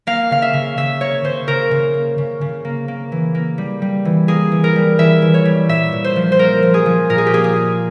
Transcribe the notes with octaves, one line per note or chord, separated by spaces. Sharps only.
A#3 F5
C#3 F5
E5
C#3
C#3 E5
A#3 C#5
C#3 C5
C#3 A#4
C#3
A#3
C#3
C#3
A#3
A#3
E3
A#3
G3
G3
E3
A#3 G#4
E3
A#4
G3
E3 E5
E3
C#5
G3
A#2 E5
A#2
C5
F3
C5
A#3 A#4
F3
G#4
F3
A#2 A#4
G#4
G4
A#3 G#4
G#4
A#3